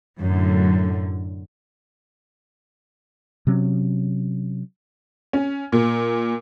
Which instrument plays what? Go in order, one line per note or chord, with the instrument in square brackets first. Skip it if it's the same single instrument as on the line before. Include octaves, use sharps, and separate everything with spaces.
[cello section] F#2 A2 D3
[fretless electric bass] C3 F#3 C#4
[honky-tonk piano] C#4
A#2